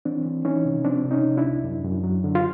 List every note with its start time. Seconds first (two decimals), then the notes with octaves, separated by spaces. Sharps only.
0.05 E3 C4 D4
0.25 E3
0.45 E3 C#4 D#4
0.65 C3
0.84 F3 C4 D4
1.04 C3
1.11 C#4 D#4
1.24 C3
1.37 D4 E4
1.44 C2
1.64 F#2
1.84 F#2
2.04 F#3
2.24 D3
2.35 F4